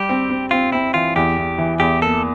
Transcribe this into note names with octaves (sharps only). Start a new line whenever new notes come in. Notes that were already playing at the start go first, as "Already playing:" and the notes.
Already playing: G3 G4
C4
C4
C4 F4
C4 E4
E3 F4
E2 G4
E2
E3
E2 G4
A#3 A4